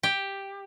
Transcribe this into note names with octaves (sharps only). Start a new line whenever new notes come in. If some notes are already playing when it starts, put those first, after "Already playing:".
G4